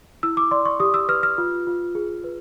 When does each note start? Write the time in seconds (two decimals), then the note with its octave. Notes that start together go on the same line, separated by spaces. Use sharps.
0.23 E4 E6
0.37 D6
0.51 D5 C6
0.65 C#6
0.80 G4 D#6
0.94 E6
1.08 B4 F6
1.23 F6
1.38 F4
1.67 F4
1.95 G#4
2.24 B4